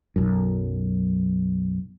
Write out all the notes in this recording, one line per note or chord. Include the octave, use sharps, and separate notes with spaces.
B1 F#2